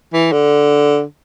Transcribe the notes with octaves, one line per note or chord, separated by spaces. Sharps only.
E3
D3